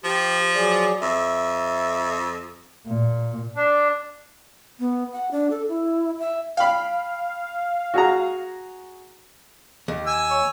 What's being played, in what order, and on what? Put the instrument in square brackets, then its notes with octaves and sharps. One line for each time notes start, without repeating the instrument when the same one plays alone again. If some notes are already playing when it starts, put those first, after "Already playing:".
[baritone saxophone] F3 [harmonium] G4
[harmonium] F#3 G#4 D5
[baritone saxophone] F2 [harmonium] E5
[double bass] A#2
[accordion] D4
[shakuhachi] B3
F#5
D4
A4
E4
E5
[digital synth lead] F5 [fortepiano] G5 B5
[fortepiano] F#4 G#4 A#5
[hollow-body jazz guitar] D#2
[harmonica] G#5 E6
[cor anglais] C#5